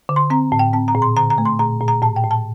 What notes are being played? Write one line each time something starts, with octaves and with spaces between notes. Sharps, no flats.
D3
C6
C4 A#5
A2
G5
C4 A5
A#5
A#2
C6
D3 A#5
A#5
A3
C6
A#2 A#5
A#2
A#5
A2 A5
G5
A2
A5